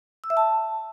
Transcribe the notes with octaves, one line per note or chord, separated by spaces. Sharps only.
E6
E5
A5